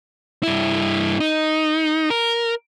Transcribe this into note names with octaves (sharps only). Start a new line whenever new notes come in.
G2 E4
D#4
A#4